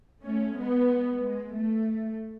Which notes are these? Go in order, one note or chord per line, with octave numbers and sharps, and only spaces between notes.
A3 C#4
G#3 B3
G#3
A3